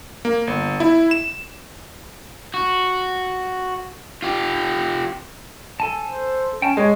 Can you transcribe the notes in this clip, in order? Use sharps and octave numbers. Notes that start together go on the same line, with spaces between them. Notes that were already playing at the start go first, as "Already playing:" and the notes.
A#3
G1
E4
E7
F#4
F4 G4
A4 G#5 A5
C5
C#4 G5 A5
G#3 C#5 D#6